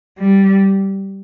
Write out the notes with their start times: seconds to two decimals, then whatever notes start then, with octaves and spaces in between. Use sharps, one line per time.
0.19 G3